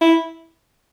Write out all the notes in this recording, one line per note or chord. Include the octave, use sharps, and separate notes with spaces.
E4